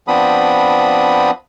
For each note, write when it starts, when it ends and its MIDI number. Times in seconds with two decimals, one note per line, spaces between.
0.08 1.31 53
0.08 1.31 59
0.08 1.31 60
0.08 1.31 62
0.08 1.31 83
0.08 1.31 87